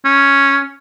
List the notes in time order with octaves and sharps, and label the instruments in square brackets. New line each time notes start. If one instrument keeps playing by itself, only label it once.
[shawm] C#4